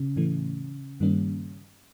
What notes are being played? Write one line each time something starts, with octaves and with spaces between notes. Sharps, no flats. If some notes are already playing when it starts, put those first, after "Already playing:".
Already playing: C#3
A2 E3 A3
G2 D#3 G3 A#3 C#4